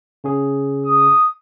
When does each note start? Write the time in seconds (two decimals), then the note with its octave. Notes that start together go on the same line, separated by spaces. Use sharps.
0.24 C#3 C#4 G#4
0.86 D#6